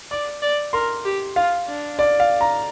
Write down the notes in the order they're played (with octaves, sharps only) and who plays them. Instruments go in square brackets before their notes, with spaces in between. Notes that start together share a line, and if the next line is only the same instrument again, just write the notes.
[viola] D5 [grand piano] D6
[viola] D5
[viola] A#4 [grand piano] C6
[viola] G4
[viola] F4 [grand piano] F5
[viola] D4
[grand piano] D5
F5
A#5